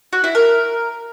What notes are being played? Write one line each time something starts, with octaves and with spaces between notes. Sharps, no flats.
F#4
E4
A#4